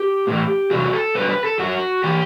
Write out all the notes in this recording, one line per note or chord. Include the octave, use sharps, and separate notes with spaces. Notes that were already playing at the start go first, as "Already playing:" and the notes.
Already playing: G4
A2 E3
E2 C3 F#3 F#4
A4
G2 D3 F#3 B4
B4
A4
F#2 F#3 F#4
E3 G4